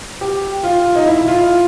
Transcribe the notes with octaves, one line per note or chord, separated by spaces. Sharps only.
G4
F4
D#4
E4
E4
F4